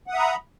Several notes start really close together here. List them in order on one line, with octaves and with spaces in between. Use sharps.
F#5 D#6 E5 A#5 B5